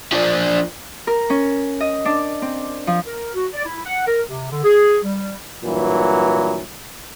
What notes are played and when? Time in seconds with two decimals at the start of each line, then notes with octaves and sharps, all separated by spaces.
0.12 F3 D4
1.07 A#4
1.30 C#4
1.81 D#5
2.05 D4
2.42 C4
2.87 F3
3.06 A#4
3.34 F#4
3.53 D5
3.65 E4
3.85 F#5
4.06 A#4
4.28 C3
4.51 D3
4.64 G#4
5.03 G3
5.64 G2 A#2 E3 F#3